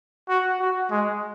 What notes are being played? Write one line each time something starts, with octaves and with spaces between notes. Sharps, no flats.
F#4
F#4
G#3